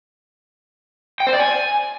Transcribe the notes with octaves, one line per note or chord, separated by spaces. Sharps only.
G5
C5
D5
G#5